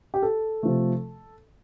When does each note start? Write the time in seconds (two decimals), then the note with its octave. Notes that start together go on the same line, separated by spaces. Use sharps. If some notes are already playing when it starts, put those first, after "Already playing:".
0.14 G4
0.23 A4
0.63 C3 F3 A3